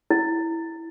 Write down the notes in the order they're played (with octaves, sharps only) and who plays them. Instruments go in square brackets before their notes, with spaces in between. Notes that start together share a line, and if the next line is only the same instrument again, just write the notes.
[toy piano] E4